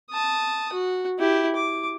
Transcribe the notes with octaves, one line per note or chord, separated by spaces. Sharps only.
A5 D#6
F#4
E4 G4
D6